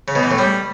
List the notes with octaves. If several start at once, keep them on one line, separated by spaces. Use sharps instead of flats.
C#3
B2
E3
A2
G3